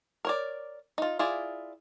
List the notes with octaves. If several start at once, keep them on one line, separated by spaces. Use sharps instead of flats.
A#4 C#5 D5
D#4 F4
E4 F4 G#4 D5